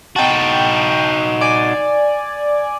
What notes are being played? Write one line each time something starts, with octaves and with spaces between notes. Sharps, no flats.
D#4 F#4 G5 A5
D5 G#5